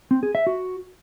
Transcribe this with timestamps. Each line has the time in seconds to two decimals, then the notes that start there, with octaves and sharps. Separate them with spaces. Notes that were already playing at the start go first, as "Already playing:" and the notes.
0.11 C4
0.23 G#4
0.35 E5
0.47 F#4